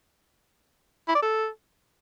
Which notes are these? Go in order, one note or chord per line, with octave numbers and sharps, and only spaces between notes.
E4
D5
A4